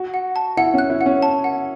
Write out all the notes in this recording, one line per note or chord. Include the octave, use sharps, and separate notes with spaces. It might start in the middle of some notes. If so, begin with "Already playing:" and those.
Already playing: F#4
F#5
A5
E4 F#5
C#4
F#6
E4
F#5
C#4
A5
F#5